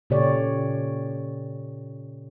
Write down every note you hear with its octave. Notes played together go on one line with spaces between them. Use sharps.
A#2 C#3 G4 A4 C#5 D5